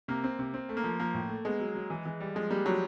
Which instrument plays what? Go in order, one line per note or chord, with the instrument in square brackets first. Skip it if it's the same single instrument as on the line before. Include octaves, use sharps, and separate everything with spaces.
[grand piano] C3 [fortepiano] A#3
[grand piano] C4
C3
C4
A3
[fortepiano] A#3
[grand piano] F3
[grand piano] F3 [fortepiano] A#3
[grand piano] A2
A3
[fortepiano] G#3 [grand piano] B3
[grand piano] F#3
F#3
E3
E3
G3
[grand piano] F3 [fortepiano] G#3
[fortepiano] G3 [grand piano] A#3
[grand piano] F3 [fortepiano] F#3